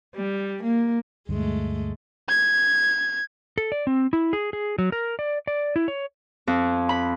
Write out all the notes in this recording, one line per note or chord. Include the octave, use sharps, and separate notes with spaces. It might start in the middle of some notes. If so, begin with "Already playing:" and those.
G3
A#3
D2 G2 G#3 A3
G#6
A4
D5
C4
E4
G#4
G#4
F#3
A#4
D5
D5
E4
C#5
F2
B5